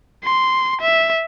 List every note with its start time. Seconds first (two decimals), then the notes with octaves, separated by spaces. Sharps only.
0.24 C6
0.81 E5